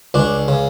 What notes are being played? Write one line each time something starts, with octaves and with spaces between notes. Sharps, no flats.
C#2 D4
C#3